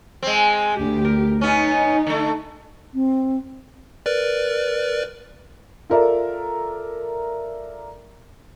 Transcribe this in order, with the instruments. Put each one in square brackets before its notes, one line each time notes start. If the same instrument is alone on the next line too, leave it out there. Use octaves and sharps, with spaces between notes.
[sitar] G#3 C4
[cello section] D2 G4
[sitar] A#4
[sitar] B3 C#4 [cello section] D#4
[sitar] D3 A3
[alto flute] C4
[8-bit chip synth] A#4 B4 D5
[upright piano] F4 A4 A#4 D5 E5